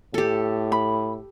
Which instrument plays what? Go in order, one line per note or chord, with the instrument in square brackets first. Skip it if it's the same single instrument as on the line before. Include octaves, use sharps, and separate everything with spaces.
[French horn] A2 [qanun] G4 A4
[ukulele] B5